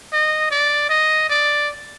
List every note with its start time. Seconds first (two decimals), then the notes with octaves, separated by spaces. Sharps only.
0.13 D#5
0.51 D5
0.90 D#5
1.30 D5